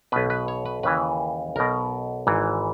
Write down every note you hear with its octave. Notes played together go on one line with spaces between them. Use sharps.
B1 B2 B4
B4
C#5
B4
D#2 C#3 E3 B4
B1 B2 A#4
G#1 G#2 E3